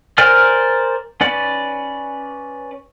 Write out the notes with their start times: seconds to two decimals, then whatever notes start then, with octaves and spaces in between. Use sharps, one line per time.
0.18 A#4 C5 D5 G#5 F6
1.21 C#4 B4 D5